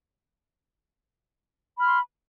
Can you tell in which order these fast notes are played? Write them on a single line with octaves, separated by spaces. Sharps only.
B5 F6 C6